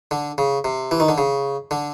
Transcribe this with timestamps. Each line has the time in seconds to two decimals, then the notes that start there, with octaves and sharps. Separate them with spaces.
0.11 D3
0.38 C#3
0.64 C3
0.91 E3
1.00 D#3
1.09 D3
1.18 C#3
1.71 D3